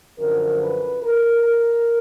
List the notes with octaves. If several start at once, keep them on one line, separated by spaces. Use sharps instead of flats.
F#2 D3 F3 A#4
B4
A#4
A#4